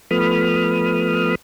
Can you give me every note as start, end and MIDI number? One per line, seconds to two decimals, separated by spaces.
0.11 1.35 53
0.11 1.35 57
0.11 1.35 59
0.11 1.35 83
0.11 1.35 87
0.11 1.35 89